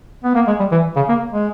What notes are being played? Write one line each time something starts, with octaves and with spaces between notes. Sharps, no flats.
B3
A#3
G#3
G3
E3
C#3
A#3
G#3